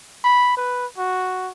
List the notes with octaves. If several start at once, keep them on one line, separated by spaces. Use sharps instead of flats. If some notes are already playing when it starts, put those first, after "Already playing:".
B5
B4
F#4